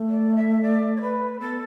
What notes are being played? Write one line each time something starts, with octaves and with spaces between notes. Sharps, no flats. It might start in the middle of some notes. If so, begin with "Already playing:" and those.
Already playing: A3
D5
E5
D5
C#5
B4
B3 A4